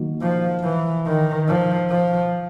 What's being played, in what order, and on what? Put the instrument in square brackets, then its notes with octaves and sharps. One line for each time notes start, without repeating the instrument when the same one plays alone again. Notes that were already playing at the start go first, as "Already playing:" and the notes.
Already playing: [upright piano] D#3 F#3 A#3
[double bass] F3
E3
D#3
F3
F3